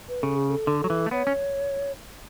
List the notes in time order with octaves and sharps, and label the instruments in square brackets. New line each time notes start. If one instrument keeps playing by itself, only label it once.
[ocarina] B4
[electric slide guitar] C#3 [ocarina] A4
[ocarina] G#4
A4
[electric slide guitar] D3
F#3
E3
A3
[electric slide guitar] B3 [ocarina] C#5
[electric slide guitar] C#4